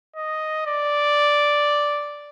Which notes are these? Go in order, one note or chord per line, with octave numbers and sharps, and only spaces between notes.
D#5
D5